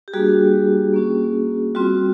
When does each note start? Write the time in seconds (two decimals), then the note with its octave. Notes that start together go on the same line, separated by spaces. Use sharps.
0.08 G4
0.13 G3 A#3 D4 F#4 G#4
0.94 A#3 C#4 F#4
1.75 G3 C4 F4 F#4